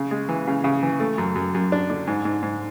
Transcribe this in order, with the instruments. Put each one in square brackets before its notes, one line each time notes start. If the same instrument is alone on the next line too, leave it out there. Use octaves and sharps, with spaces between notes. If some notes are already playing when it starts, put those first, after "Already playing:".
Already playing: [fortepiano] C#3
G#3
E3
C#3
C#3
E3
A3
F#2
F#2
F#2
D4
D3
G#2
G#2
G#2